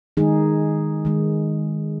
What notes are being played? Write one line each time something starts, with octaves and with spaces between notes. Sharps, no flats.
D#3 G#3 D#4 G#4
D#3 G#3